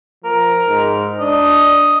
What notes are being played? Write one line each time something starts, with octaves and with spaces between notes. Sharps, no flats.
F3 A#4
G#2
D4 D#5